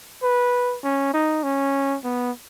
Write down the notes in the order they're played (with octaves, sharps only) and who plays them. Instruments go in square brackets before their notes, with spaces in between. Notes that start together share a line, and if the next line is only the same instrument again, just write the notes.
[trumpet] B4
C#4
D#4
C#4
B3